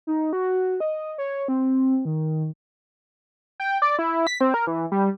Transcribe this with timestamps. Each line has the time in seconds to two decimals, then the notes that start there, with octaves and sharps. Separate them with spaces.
0.07 D#4
0.33 F#4
0.80 D#5
1.18 C#5
1.48 C4
2.05 D#3
3.60 G5
3.82 D5
3.99 E4
4.27 B6
4.41 C4
4.54 A#4
4.67 E3
4.92 G3